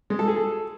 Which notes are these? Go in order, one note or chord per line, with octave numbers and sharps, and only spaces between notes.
G#3
A4
G#4
A4